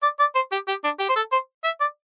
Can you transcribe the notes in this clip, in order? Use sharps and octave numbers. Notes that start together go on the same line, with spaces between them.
D5
D5
C5
G4
G4
D4
G4
C5
A4
C5
E5
D5